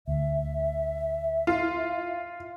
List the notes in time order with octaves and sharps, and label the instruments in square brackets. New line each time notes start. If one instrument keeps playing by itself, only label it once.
[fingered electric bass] D2 [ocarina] E5
[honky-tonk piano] F4